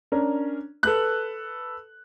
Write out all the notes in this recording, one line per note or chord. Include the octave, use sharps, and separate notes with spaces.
C#4 D4 A#4
A4 B4 F#6